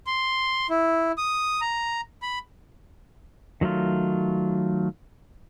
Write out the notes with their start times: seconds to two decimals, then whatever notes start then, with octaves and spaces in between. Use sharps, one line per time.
0.07 C6
0.70 E4
1.18 D#6
1.61 A#5
2.22 B5
3.61 D#3 F#3 A3 F4